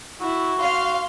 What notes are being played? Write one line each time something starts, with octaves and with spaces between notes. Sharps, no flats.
E4 F#4
F5 C6